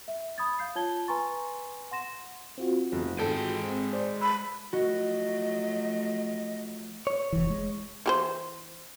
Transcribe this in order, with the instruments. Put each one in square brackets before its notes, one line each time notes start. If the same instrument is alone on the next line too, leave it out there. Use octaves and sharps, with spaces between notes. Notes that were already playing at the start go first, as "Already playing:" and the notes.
[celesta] E5
B5 D#6 G#6 A6
F5 G6 C7
F4 C#5 A5 G#6 G7
B4 G#5 A#5 C6 C#6 A6
F#5 C6 A#6 E7
[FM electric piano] C4 F4 F#4
[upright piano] F1 F2
[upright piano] G#1 A4 [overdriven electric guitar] G#3 G5
[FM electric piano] C4
C5 D5
[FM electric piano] A5 E6 [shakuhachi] B5
[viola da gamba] F3 F#3 A3 [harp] F#4 [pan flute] D#5
[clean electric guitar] C#5
[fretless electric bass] F1 E3
G#3
[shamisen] E3 G4 C5